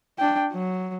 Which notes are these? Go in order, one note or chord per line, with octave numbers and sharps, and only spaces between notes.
D4 G5
F#3